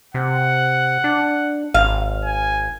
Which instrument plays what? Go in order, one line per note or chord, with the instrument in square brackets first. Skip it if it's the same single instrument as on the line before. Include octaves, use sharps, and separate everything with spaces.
[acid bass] C3 [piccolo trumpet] F#5
[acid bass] D4
[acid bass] G#1 [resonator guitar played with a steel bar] F5
[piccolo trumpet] G#5